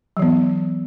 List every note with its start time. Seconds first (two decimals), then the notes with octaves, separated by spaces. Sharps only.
0.17 F#3
0.19 E3
0.22 B3